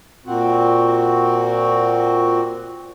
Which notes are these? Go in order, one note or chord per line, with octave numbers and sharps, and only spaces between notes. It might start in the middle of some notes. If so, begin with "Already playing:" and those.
A#2 C4 F#4